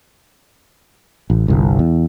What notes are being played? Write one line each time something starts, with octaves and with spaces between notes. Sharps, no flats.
A1
G1 C2
E2